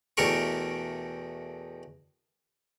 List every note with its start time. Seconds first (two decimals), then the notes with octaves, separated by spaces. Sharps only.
0.17 E2 B2 A3 G4 A#4 C#6